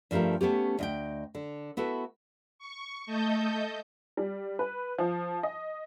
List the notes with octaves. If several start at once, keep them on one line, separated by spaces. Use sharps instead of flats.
G2 F3 A3 G4 A#4
A3 B3 C#4 G4
D2 D#5 G5
D3
B3 E4 F#4 A4 B4
C#6
A3 A4 D#5 G6
G3
B4
F3
D#5